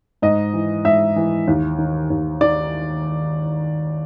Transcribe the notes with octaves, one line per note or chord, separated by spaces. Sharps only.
G#2 D#5
E3
G#2 E5
E3
D#2
D#3
D#2
D#3 D5